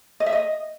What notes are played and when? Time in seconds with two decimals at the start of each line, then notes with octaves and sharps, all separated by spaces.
0.20 D#5
0.26 E5
0.33 D#5